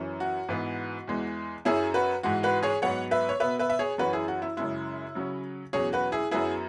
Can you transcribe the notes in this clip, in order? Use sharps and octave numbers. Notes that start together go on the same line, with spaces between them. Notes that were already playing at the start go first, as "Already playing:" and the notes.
Already playing: F#2 E3 C#4
F#4
G#2 E3 B3
E2 E3 G#3
F#2 F#3 C#4 E4 G#4
F#4 B4
G#2 E3 G#3 F#4
F#4 B4
G#4 C#5
G#2 F#3 B3 C#5 F#5
B4 E5
C#5
B2 B3 B4 E5
B4 E5
E5
G#4 C#5
F#2 E3 C#4 F#4 B4
E4 G#4
F#4
E4
F#2 C#3 G#3 E4
C#3 F#3 C#4
E2 B2 F#3 C#4 G#4 C#5
F#4 B4
E4 G#4
F#2 F#3 B3 E4 G#4